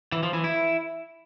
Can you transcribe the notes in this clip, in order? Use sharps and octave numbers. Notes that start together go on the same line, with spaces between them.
E3
F3
E3
E4